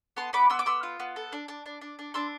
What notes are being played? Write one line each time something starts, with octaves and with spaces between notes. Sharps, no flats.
B3 A5 C6
B3 B5 D6
B3 C6 E6
D6
B3 C6 E6
F4
B3
A4
D4
D4
D4
D4
D4
D4 C6 E6